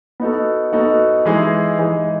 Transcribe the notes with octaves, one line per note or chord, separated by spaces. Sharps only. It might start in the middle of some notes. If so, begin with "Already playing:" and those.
B3 D#4 F#4 A4
B3 D#4 F#4 A4
E3 G#3 D#4 G#4
E3 G#3 D#4 G#4